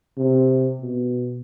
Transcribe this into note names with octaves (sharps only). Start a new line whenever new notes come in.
C3
B2